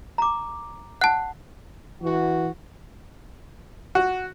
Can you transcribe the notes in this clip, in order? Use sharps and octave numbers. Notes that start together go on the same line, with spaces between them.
A#5 D6
F#5 A5 F#6
E3 F#4
F#4